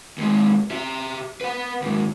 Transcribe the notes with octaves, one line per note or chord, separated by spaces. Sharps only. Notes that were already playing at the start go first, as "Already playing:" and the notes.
D#2 G#3
G4 E5
B4 F#5
D#2 G#2